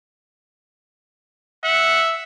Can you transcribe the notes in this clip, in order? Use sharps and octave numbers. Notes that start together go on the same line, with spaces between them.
E5 F#5